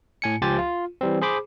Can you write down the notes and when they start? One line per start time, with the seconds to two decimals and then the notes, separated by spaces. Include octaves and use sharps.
0.22 A2 G#5 C#7
0.42 C#2 F3 G4 C5 G#5 A6
0.58 F4
1.01 E3 G3 C4
1.22 G#4 C5 B5 D6